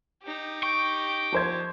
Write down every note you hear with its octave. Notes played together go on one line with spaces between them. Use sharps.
D#4 G4
G5 C#6
F3 C5 G#6